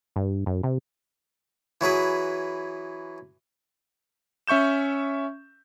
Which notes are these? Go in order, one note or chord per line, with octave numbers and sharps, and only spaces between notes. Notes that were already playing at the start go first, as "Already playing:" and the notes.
G2
F#2
C3
E3 F#3 G#4 B4
C#4 E5 C#6 G6 E7